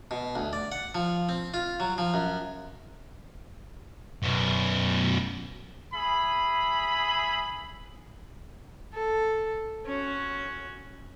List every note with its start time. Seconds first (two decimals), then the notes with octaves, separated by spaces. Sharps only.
0.11 B2
0.35 D2
0.53 D5
0.72 F#5
0.95 F3
1.29 C4
1.54 F4
1.80 F#3
1.98 F3
2.14 F#2
4.23 F#2 B2
5.93 G#4 E5 B5
8.94 A4
9.86 C#4 F#4